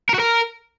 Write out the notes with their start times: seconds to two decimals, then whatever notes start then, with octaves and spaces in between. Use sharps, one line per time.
0.09 A#4
0.14 F#4
0.20 A#4